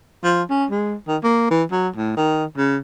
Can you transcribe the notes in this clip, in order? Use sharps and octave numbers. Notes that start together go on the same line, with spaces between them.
F3
C#4
G#3
D#3
A#3
E3
F#3
A2
D#3
C#3